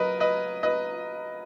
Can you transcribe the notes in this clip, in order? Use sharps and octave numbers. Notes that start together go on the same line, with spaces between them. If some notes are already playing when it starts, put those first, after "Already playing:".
Already playing: F#3 A#4 B4 D#5
B4 D#5
B4 D#5